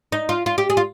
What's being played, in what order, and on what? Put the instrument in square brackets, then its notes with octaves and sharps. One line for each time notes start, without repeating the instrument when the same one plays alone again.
[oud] D#4
F4
F4
G4
G#4
F4